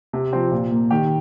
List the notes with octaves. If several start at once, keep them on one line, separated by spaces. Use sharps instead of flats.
C3
F3 C4
A#2
A#3
D#3 G4